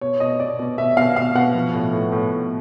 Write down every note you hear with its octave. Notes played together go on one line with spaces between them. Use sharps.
B2 C#5
B2 D#5
B2 D5
B2
B2 E5
B2 F5
B2 F5
B2 F#5
F3
A2
A2
A2
A2